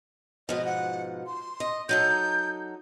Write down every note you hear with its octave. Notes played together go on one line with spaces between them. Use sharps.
G#2 B2 F3 D#5
F#5
C6
D#5
F#3 D#4 A4 G6